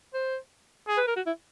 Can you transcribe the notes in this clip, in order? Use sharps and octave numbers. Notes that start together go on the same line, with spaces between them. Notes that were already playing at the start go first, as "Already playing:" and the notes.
C5
G#4
B4
A#4
F#4
E4